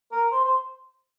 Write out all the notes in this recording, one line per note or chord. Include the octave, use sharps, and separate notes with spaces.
A#4
C5
C5